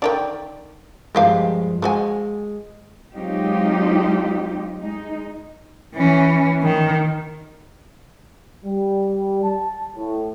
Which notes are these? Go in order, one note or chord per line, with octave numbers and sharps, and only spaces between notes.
D3 D#3 D5 G5
G2 F3 G#3 A#3 G4 F5
F3 G#3 F#4 G#5
F#3 G#3 C4 D#4 F4 G4
G#3 D#4
E3 C#4
D#3
G3
A5
A2